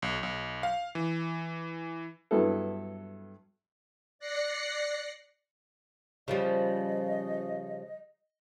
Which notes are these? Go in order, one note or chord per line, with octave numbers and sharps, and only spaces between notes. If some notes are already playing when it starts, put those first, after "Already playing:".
B1
B1
F5
E3
G2 F#3 B3 E4 A4
D5 F#6 A#6 C7 C#7
C#3 F3 G3 D#5